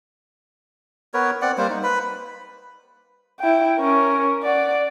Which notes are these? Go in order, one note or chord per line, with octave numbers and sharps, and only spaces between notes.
B3 A#4 B4 C#5
C4 D5 F#5
G3 A#3 C5
D#4
B4 B5
E4 G5
C#4 A#4
D5 F#5